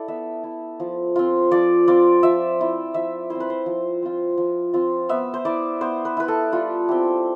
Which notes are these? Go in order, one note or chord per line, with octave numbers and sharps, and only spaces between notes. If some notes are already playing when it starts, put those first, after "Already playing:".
Already playing: E4 A4 D5
B3 E5
E4
F3
C4 F4
F3 D5
C4 F4 D5
F3 E5
C4 E4
F3 E5
C4 E4 C5
B4
C5
F3
C4 F4
F3
C4 F4
B3 E5
C5
E4 D5
B3 C5
B4
E4 B4
A4
G3 F4
C4 E4 G4